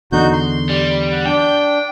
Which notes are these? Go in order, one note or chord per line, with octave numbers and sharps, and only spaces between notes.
E2 D3 D#4 F#4 G6
C6
G3
F#5
D4 G5